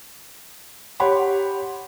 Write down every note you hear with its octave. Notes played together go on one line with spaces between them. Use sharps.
G4 C#5 F#5 B5 C6